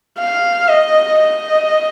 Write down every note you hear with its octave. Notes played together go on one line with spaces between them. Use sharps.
F5
D#5
D#5